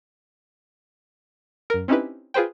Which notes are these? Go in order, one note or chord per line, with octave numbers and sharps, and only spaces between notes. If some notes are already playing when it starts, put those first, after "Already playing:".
F#2 A#4
C4 C#4 D#4 E4 G4 B4
F4 G#4 B4 C5 G5